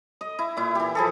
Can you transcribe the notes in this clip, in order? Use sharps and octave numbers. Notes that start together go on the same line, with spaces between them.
D#5
E4
A#2 E4
E3 G4
F3 G#4 A4